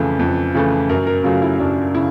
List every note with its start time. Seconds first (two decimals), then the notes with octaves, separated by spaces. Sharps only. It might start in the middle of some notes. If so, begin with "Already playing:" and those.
Already playing: F2 C#3 E3 A3
0.19 F2
0.55 C#3 E3 A3
0.89 F#2 A#4
1.07 A#4
1.24 C#3 F#3 A3 F4
1.42 E4
1.59 F#2 D4
1.95 C#3 E4